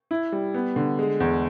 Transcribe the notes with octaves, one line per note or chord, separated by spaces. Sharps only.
E4
G3
B3
D3
G#3
E2